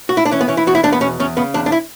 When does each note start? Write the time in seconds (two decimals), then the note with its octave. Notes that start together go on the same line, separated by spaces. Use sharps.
0.09 F#4
0.17 E4
0.25 D4
0.31 E3 C#4
0.41 B3
0.48 E3 C#4
0.57 E4
0.67 E2 F#4
0.75 E4
0.83 E2 D4
0.93 B3
1.01 B2 C#4
1.20 E2 C#4
1.37 C#3 B3
1.54 E2 D4
1.66 D4
1.72 E4